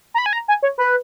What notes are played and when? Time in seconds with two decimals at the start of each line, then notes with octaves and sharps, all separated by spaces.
0.14 A#5
0.18 B5
0.26 G#5
0.33 A#5
0.48 G#5
0.63 C#5
0.78 B4